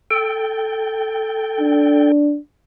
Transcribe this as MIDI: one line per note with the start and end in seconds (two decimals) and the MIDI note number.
0.11 2.12 69
0.11 2.12 79
1.61 2.38 62